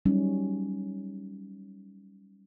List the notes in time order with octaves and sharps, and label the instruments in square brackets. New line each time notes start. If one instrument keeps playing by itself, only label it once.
[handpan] F#3 G3 C#4 D#4